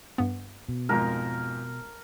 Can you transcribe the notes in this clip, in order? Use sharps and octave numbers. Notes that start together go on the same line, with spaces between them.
G2 B3
B2
F2 G#2 A#4